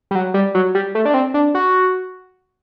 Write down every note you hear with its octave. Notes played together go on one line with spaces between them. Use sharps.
G3
F#3
G3
F#3
G3
A3
D4
C4
D4
F#4